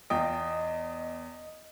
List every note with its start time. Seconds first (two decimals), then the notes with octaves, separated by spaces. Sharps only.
0.10 E2 F4 D#5 G5